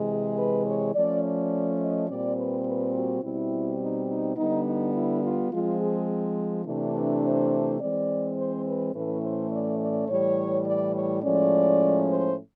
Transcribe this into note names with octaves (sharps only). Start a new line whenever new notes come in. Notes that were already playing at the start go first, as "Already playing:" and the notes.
Already playing: C3 E3 G#3
G#4
B4
C#5
F3 A3 C#4 D5
D5
D#5
A#2 G3 C4 D5
B4
B4
F#4
B2 G3 C4 E4
D#4
D#4
D3 G3 B3 D#4
D#4
E4
F4
F3 G#3 C4 F4
G#4
C3 E3 A3 D4
B4
C5
E3 G#3 C4 D5
C5
B4
A2 E3 A3 C#4 B4
C5
D5
D5
A2 E3 G3 C#5
D5
C#5
A2 F3 G#3 C#4 D5
C5